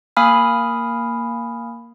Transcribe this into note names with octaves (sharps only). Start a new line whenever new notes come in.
A#3 F5 G#5 B5 D#6 F6